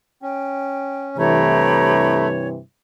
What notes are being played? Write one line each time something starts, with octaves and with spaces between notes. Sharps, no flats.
C#4 G5
G2 C3 E3 A3 G4 C#5 A#5 B5